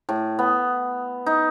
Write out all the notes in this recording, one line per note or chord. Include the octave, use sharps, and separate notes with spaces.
A2
B3
D#4